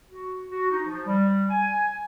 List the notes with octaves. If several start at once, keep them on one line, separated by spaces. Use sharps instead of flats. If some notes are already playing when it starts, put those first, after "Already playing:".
F#4
F#4
D#4
F3
G3
G#5